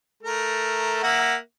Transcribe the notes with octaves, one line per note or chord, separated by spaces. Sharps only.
A3 A#4
A#3 E5 F#5